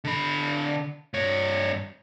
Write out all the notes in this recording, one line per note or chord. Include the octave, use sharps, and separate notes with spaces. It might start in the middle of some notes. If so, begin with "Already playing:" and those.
D3 B5
G2 C#5